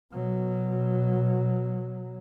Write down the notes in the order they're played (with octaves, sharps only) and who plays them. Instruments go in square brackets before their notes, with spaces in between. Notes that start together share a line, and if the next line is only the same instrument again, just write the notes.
[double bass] B2 F#3